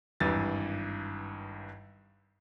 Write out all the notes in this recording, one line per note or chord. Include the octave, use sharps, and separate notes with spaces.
G#1 G2 E3 A6